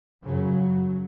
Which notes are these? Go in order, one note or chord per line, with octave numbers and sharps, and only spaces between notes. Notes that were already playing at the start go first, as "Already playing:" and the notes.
F#2 C#3 F#3